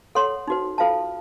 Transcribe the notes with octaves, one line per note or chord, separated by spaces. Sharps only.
A4 C#5 F#5 C6
D#4 F#4 C5
F4 A4 C5 F5 A5